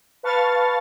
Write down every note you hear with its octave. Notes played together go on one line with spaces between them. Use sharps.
B4 F5 A5 C#6 F6 A6